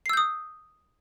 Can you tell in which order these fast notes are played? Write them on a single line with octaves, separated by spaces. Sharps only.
C7 E6 G6 D#6